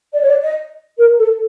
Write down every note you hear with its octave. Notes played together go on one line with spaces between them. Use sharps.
D5
C#5
D5
D#5
A#4
A4